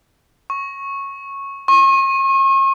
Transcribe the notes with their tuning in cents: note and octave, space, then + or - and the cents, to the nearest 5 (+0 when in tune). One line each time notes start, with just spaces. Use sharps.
C#6 -10
C#6 -40